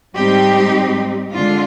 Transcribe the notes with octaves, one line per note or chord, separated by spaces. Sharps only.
G#2 G3 C4 D#4 G4
D3 G#3 D4 F4